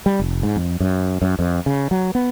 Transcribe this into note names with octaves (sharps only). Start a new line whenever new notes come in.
G3
F1
G#2
F2
F#2
F#2
F2
C#3
F#3
B3